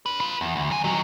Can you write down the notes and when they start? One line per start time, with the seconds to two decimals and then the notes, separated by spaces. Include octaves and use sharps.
0.06 D4 B4
0.20 F4 B4
0.41 E2
0.56 D2
0.71 F#3 G#5
0.84 D#3 F#3